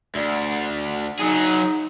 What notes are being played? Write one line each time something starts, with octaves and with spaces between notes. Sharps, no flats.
D2 D5
F#3 D#4 G#4